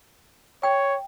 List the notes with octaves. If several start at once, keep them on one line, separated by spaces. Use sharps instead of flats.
C#5 G5